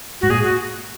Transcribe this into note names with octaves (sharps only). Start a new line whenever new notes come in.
G#2 F#4
A#2 G#4
F#4